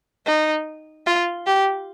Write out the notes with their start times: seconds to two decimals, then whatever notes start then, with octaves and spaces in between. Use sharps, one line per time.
0.27 D#4
1.07 F4
1.47 G4